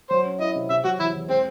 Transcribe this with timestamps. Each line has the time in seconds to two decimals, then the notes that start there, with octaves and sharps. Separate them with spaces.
0.09 F#3 C5
0.25 C#4
0.39 E4 D#5
0.55 C3
0.70 C3 E5
0.84 F#3 F#4
0.99 E2 E4
1.14 E2
1.29 G#3 C4